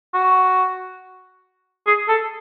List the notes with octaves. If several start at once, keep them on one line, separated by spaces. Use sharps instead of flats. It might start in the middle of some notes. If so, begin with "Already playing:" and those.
F#4
G#4
A4